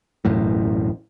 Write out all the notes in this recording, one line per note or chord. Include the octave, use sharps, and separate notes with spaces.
E1 A1 F#2 A2